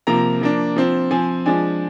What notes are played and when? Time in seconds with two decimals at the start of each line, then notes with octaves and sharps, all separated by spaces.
0.07 C3 F3 A#3 A#5
0.41 F3 A#3 D4
0.76 F3 C4
1.11 F3 C4 G#5
1.46 F3 G#3 D4 G#5